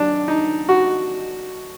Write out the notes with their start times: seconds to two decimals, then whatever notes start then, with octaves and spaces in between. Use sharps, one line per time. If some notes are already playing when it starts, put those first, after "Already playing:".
Already playing: F#2 D4
0.28 D#4
0.69 F#4